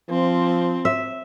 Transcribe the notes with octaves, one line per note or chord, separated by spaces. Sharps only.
F3 C4
E5